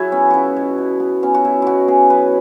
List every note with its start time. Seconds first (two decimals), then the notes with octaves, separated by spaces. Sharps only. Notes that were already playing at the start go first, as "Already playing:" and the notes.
Already playing: F#3 E4 F#4 G#4
0.12 B3 C#4
0.30 C#3 E4 F#4
0.56 B2
0.78 B2
1.00 B3
1.23 B3 C#4
1.34 F#4
1.45 B2 E4
1.62 B2 E4 F#4
1.88 B3 G#4
2.10 F#2 B4